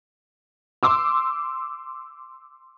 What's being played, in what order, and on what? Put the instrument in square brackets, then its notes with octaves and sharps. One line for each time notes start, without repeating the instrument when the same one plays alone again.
[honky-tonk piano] C6 D6 E6